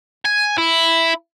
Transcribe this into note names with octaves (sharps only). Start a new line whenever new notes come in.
G#5
E4